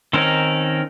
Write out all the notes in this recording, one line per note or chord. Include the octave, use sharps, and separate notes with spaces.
D#3 C4 C#4 D#4 A#4